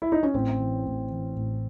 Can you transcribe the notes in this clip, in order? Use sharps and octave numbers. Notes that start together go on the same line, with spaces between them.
E4
D#4
C#4
A1 C4
E3
A1
E3
A1